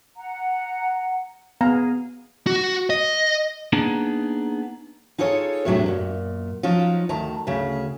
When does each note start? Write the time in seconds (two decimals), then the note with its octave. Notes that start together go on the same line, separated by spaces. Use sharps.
0.16 F#5 A#5
1.61 B3 G#4 F5 A#5
2.47 F#4
2.90 D#5
3.73 A#3 B3 D4 D#4 G#4
5.18 D#4 F4 G#4 A4 C#5
5.65 E2 A2 C3 F#3 A3 D4
5.86 F#2 A#2
6.63 F3 F#3 C#4 D#4 F4
7.09 D2 D#3 A5 A#5
7.47 D2 C#3 G#4